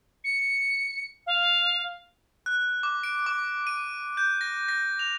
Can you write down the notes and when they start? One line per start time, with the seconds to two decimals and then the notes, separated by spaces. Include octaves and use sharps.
0.24 C#7
1.27 F5
2.46 F#6
2.83 D6
3.03 D7
3.26 D6
3.67 D#7
4.17 G6
4.41 A#6
4.69 A#6
4.99 F7